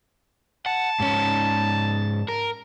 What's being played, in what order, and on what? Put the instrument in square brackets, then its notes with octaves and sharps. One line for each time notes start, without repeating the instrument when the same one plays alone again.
[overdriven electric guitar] F#5 [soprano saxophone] A5
[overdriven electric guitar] G#2 C#4
A#4